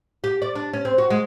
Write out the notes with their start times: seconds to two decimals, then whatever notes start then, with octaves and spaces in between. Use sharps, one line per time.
0.24 G4
0.42 D5
0.55 D4
0.73 C#4
0.85 C4
0.98 F#4
1.10 G#3